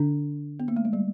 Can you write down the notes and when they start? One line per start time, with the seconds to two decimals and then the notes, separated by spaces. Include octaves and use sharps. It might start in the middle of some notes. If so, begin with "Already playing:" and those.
Already playing: D3 D4
0.60 B3
0.68 A#3
0.76 A3
0.85 G#3
0.93 G3